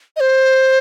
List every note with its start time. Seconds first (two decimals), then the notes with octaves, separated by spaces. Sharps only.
0.16 D#5
0.20 C5